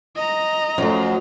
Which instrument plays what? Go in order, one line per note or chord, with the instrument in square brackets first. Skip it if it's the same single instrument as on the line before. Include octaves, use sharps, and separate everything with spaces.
[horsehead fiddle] D#5 A#5
[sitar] F#2 [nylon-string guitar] F3 A3